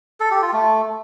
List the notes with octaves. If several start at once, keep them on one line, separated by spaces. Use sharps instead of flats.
A4
G4
F4
A3